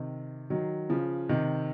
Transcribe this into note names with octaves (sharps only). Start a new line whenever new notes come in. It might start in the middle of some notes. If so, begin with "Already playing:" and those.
Already playing: C3 D#3
D#3 F#3
C#3 F3
C3 D#3